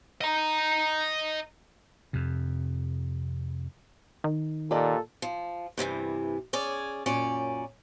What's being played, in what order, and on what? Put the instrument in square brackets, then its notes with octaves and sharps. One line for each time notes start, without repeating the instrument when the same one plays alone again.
[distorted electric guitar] D#5 A#5
[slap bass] F2 C3
[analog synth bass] D#3
[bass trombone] A#2 [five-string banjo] G4 D5 D#5 [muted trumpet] A4
[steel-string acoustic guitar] F3
G2 C3 D#3 E3
C#4 G#4 D5
F#2 A#2 C#4 D5